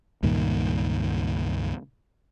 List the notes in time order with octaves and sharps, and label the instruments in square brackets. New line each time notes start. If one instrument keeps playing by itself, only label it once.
[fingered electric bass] C#2 G2 A#2 D#3